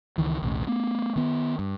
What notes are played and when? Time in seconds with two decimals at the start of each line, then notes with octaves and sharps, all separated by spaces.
0.18 C#2 D#3 E3
0.42 B1 E2 A2 C#3
0.67 A3 B3
1.16 D#3 B3
1.59 G2